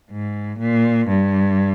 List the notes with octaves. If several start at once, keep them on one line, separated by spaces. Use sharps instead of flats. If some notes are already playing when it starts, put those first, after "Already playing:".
G#2
A#2
G2